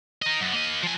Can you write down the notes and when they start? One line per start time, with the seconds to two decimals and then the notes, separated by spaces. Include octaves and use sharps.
0.22 A#4 D#5
0.40 F#2 B3
0.53 A#3 D#5
0.83 F3 G#5